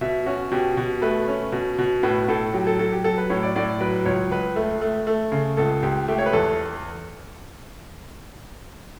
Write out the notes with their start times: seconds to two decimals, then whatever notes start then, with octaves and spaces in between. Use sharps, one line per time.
0.01 B2 E5
0.26 C#4 F#4
0.52 B2 G4
0.77 B2
1.02 A3 B4
1.28 C#4
1.52 B2
1.78 B2
2.03 A2 B4
2.28 A2 A4
2.53 F#3 G4
2.67 A4
2.79 F#3 A4
2.92 G4
3.04 F#3 A4
3.18 B4
3.30 A2 C#5
3.43 D5
3.56 A2 D5
3.80 F#3 B4
4.05 C#2 C#5
4.31 C#2 B4
4.56 A3
4.81 A3
5.07 A3
5.32 C#3
5.57 C#2 A4
5.83 C#2 G4
6.08 A3 G4
6.18 C#5
6.26 B4
6.33 E2 A4